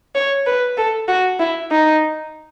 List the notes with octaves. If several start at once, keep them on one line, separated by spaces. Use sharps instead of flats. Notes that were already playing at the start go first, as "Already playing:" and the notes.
C#5
B4
A4
F#4
E4
D#4